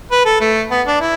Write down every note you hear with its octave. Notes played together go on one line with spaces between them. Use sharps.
B4
A4
A3
B3
D4
E4